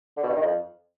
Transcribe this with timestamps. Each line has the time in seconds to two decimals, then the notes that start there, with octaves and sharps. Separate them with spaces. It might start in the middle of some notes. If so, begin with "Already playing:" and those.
0.17 D3
0.23 B2
0.30 G2
0.36 D#3
0.42 F2